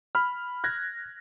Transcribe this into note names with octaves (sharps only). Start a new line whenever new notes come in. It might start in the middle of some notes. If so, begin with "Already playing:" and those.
B5 F6
F#6 G#6 A#6